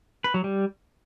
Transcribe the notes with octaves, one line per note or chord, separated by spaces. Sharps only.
B4
F#3
G3